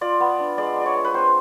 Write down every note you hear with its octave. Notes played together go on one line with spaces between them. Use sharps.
F4 D5
B3
D4
G#3 D5
D4
C#5 D5
B3
B4
C4 C5